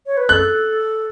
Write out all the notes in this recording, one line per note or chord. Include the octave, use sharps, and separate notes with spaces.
C#5
B4
A4 F#6